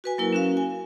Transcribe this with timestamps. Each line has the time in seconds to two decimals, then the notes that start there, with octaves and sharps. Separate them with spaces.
0.04 F#4 B4 G#5
0.18 F#3 A#3 E4 A#4
0.33 C#4 F#4 F5
0.57 G#5